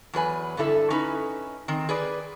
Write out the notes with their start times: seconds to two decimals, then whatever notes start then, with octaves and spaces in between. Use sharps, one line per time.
0.14 E2 F#3 B4 G#5
0.57 G2 D3 E4 A4 E5
0.90 C#4 D#4 E4 B4
1.68 D#3 C4
1.89 G#4 B4 D5